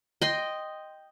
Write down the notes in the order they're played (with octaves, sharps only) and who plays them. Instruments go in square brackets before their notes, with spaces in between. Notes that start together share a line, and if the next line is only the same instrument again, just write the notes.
[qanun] D#5 G5 C6